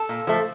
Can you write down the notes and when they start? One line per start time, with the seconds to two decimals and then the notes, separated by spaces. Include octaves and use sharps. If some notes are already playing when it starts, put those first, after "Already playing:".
Already playing: A4
0.09 A#2
0.27 F3 A3